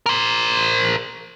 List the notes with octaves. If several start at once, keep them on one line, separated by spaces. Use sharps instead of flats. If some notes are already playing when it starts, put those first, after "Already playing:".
A#4 C5